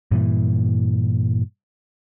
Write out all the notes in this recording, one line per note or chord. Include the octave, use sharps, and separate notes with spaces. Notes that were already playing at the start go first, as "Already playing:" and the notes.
G2 A#2 E3